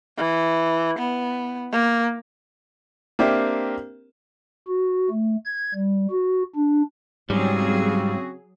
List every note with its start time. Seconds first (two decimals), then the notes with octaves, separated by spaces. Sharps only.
0.18 E3
0.98 B3
1.72 A#3
3.19 A#3 C4 D4 G4 A#4 E5
4.68 F#4
5.10 A3
5.45 G#6
5.74 G3
6.11 F#4
6.55 D4
7.30 G#2 C#3 F#3 G3 C4 F#4 G#4